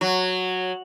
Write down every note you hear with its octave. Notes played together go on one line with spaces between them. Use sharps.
F#3